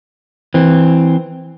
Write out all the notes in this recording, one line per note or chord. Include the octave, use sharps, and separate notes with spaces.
E3 C4